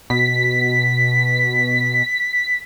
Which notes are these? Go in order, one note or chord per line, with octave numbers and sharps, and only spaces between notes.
B2 B6